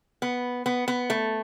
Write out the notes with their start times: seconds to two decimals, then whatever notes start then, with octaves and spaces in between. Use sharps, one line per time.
0.22 B3
0.66 B3
0.88 B3
1.10 A3